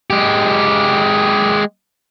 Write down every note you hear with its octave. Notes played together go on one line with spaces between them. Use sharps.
G#3 G4